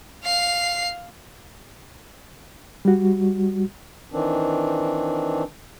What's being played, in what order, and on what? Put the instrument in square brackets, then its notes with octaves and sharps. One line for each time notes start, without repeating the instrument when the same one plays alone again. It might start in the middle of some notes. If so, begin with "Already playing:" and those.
[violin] F5 C7
[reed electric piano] G3 F#4
[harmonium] D#3 E3 C4 D4